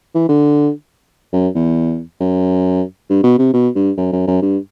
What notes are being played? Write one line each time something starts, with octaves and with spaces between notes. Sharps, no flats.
E3
D3
F#2
E2
F#2
G2
B2
C3
B2
G2
F#2
F#2
F#2
G2